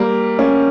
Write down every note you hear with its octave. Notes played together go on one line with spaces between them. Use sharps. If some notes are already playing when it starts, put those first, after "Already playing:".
Already playing: G3 A#3
A#3 C#4